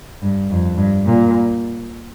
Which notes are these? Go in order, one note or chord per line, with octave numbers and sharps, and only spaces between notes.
G2
F2
G2
A#2